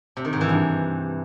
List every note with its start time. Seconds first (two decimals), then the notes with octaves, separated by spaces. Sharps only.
0.17 C3
0.25 D#3
0.33 G#2
0.41 E3
0.49 G2